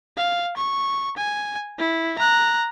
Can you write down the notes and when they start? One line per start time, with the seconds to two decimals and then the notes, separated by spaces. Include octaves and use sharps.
0.17 F5
0.57 C#6
1.17 G#5
1.78 E4
2.18 A#5 F#6